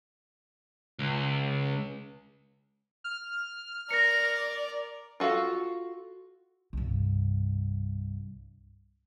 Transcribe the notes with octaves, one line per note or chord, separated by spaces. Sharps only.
C#2
F6
A#4 D5 A#6 C#7
F4 F#4 A4 F5
C2 G2